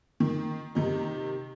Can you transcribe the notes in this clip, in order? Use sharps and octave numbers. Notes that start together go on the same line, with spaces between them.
D#3
C3 D#3 D#4